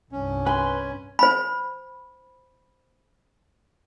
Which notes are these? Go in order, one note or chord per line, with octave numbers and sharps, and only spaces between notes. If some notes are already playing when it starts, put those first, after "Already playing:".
C2 G2 C#4
B4 G#5 C6
C5 B5